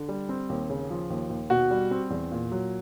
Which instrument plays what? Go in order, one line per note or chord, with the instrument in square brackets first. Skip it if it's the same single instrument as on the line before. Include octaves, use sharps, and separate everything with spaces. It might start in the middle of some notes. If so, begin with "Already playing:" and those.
Already playing: [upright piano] D3
G3
C4
D#2
C#3
F3
D#2
D#2
[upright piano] B2 [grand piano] F#4
[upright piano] G3
C4
E2
A#2
F#3